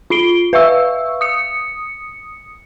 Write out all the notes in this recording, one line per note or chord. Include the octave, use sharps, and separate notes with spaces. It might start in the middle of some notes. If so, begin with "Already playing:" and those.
F4 B5 C7 D7 G7
B4 E5 F5 C#6 E6
D#6 C#7